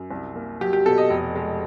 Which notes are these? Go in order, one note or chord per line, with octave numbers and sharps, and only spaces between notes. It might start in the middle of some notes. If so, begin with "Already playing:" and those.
Already playing: F#2
C2
A#3
F#3 G4
G4
B2 A4
D#5
F1
G#3